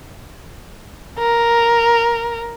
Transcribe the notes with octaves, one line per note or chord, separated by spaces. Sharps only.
A#4